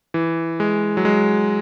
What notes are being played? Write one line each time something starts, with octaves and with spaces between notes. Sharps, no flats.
E3
G#3
F#3
G#3